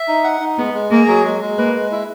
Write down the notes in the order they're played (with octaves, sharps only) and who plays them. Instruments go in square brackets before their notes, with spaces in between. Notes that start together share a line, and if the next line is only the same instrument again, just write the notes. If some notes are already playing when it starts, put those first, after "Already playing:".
Already playing: [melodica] E5
D#4
F#5
D#4
[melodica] G#3 [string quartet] B3
[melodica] G#3
[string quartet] A#3 [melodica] G#4
[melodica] F#3
G#3
G#3
[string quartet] A#3 [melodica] B4
[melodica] G#3
E4